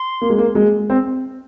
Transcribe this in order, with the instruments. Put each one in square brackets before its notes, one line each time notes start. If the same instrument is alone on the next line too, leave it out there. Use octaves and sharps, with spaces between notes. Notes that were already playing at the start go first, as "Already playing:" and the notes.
Already playing: [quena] C6
[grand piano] A#3
G#3
A#3
G#3
C4